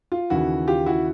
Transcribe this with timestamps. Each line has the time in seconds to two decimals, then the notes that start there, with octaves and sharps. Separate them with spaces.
0.12 F4
0.30 D#2 C#3 E3 E4 F#4
0.68 F4 G4
0.86 E4 F#4